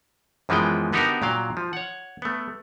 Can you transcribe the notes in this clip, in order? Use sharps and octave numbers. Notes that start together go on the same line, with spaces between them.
F#2 E3 F3 G#3 B3 G5
D3 B3 D#4 F#4 G4 A#4
A#2 F#3 F5 G5
F3
C#5 F#5
A3 B3